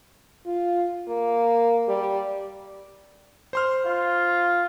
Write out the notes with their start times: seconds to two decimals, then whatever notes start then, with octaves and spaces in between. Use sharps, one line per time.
0.46 F4
1.08 A#3
1.88 G3
3.53 C5 C6 F6
3.85 F4